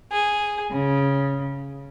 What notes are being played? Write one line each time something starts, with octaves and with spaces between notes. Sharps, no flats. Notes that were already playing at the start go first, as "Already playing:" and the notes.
G#4
C#3